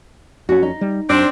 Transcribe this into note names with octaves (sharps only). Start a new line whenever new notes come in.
F2 C#4 F#4
D#4
G3
F#2 C4 D4